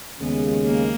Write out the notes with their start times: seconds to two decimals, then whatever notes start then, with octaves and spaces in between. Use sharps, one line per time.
0.19 D#2 C#3 G#3 B3
0.66 A#3